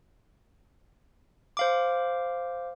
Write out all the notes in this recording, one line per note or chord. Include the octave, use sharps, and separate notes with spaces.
C5 F5 D6